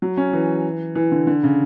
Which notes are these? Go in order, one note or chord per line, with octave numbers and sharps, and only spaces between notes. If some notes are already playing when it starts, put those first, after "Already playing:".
F#3
C#4
E3
E3
D3
D3
C#3